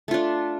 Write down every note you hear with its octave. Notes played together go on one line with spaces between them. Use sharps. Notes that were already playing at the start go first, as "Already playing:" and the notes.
A3 D4 F4